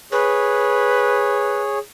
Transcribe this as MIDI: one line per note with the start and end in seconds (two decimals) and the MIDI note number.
0.12 1.79 68
0.12 1.61 71
0.12 1.79 73